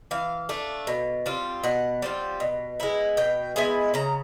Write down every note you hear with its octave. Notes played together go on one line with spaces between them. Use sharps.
E3 F5
A3 D4
B2
G3 C4 F4
B2 F#5
G3 C4 F4
B2
G#3 B3 E4
B2 G5
G#3 B3 E4 G#5
C#3 A#5